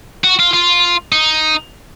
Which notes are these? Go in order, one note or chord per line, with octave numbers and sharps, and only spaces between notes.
F#4
F4
F4
D#4